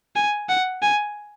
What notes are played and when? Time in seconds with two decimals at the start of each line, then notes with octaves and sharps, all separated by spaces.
0.16 G#5
0.49 F#5
0.82 G#5